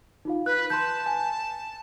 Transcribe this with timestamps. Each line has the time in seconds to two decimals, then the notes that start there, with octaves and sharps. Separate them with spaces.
0.25 D#4 F4 F5
0.46 B4 F#6
0.70 A5 C6 G6
1.06 G#5